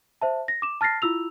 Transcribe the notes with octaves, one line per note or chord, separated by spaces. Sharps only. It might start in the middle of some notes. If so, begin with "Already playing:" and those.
C5 E5 A5
A#6
D6 E7
A5 F6 A6 A#6 C7
E4 F4 E6 F7